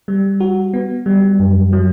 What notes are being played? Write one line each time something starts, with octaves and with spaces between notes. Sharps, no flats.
G3
F#4
B3
G3
F#2
F#3